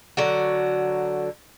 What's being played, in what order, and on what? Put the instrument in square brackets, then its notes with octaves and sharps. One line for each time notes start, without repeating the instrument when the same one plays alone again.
[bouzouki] D3 F#3 F#4